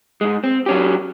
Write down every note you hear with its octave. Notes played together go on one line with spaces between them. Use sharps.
G#2 G#3
C4
F#3 C#4 G4